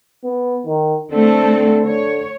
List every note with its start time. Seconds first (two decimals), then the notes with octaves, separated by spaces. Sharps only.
0.24 B3
0.67 D#3
1.11 D3 A3 C4 A4
1.86 D3 C#5